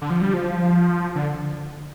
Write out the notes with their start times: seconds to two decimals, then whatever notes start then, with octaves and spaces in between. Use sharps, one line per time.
0.02 D3
0.10 F3
0.21 G3
0.34 F3
1.15 D3